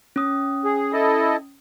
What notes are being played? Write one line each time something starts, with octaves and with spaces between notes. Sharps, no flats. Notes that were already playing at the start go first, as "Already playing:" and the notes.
C#4 D#6
G#4
E4 A4 D#5